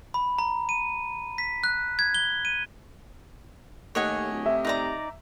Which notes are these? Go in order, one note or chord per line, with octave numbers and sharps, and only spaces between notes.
B5
A#5
D#7
B6
F#6
G#6
G7
D#7
D#2 A3 G4 C#5 D#5 F#5 G#5
D1
C3 E5
D#4 D5 A#5